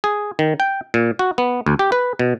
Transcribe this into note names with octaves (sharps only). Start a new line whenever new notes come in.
G#4
D#3
G5
A#2
F#4
B3
D2
G4
B4
B2